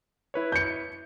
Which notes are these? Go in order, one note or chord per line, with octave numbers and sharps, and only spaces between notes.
E4 B4 C#5
G6 C#7